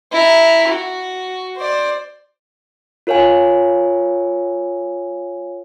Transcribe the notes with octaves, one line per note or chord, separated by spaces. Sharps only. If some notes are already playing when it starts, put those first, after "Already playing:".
E4 A#5
F#4
C5 D5
F4 A#4 C#5 F5 G#5